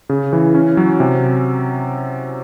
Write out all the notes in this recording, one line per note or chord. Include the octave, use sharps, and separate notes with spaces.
C#3
E3
C#4
F#3
C3